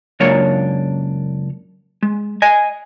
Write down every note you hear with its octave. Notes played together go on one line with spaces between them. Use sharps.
C#2 F#2 A#3 D4 C#5
G#3
D#5 G#5